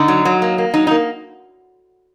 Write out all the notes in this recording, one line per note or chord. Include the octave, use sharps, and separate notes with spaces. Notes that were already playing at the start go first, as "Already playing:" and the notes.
Already playing: D3 D#4
F#3
F#3
A#3
A#3
F#3 D#4
D#4
A#3